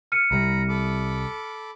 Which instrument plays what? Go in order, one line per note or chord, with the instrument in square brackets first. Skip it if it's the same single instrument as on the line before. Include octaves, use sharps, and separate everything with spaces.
[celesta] F6 C#7 D#7
[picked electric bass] C2 G3 [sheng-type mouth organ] A#5 B5
[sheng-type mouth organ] A4 B5 D6